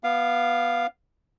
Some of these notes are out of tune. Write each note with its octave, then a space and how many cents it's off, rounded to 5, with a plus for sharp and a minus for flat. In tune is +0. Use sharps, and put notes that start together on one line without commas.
B3 -10 F5 -5 D6 +40